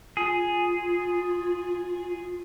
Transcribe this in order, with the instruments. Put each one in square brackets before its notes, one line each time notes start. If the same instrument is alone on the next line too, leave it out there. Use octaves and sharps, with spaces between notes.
[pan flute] F4 [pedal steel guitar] G#4